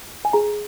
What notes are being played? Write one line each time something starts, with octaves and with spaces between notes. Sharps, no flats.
G#5
G#4 A#5